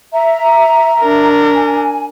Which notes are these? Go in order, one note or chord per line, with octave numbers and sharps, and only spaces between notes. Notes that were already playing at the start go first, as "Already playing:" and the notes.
E5 A#5
D4 A#4
G#5